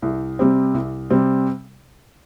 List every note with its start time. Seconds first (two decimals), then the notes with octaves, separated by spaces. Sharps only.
0.02 C2
0.39 C3 G3 C4
0.74 C2
1.10 C3 G3 C4